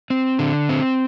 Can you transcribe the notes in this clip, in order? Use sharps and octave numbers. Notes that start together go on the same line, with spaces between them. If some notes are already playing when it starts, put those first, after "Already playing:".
C4
D3
C4